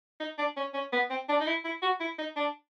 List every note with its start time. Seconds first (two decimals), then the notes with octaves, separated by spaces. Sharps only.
0.20 D#4
0.38 D4
0.57 C#4
0.74 C#4
0.93 B3
1.10 C4
1.29 D4
1.40 D#4
1.47 E4
1.64 E4
1.82 F#4
2.00 E4
2.18 D#4
2.36 D4